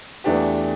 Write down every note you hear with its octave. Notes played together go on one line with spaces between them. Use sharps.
E2 E3 A3 D4 G4